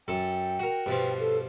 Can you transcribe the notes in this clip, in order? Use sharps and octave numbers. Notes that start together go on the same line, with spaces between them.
F#2 A4 G5
F#4 A#4
G2 B2 F3
A4